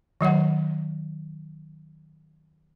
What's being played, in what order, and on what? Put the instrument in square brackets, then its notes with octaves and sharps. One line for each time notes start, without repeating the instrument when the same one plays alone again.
[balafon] D#3 F#3 C#5 F#5